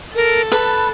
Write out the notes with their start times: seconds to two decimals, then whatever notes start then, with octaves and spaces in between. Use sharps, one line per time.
0.15 A4 A#4
0.52 B4 A5